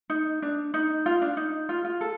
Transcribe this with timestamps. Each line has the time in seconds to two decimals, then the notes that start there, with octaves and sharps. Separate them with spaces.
0.10 D#4
0.42 D4
0.74 D#4
1.06 F4
1.22 D4
1.37 D#4
1.69 F4
1.84 F4
2.01 A4